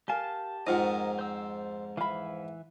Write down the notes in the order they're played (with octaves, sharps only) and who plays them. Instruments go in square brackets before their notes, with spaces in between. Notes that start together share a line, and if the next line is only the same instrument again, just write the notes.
[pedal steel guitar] G4 A5 [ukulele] A#4 F5 G#5
[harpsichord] F2 G#2 [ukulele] D#4 F4 F#5 [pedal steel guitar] A#4 D#5
[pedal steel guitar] C5 E6
[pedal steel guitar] E3 E5 [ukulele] F5 B5